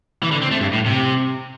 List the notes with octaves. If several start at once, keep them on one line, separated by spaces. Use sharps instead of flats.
E3
D3
C4
A3
G2
A2
C3